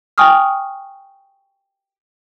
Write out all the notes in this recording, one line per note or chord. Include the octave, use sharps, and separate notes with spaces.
G5 G#5 C#6 D#6 F6